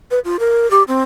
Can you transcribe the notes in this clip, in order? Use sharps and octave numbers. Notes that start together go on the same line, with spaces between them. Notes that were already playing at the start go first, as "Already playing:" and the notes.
B4
F4
A#4
G4
C4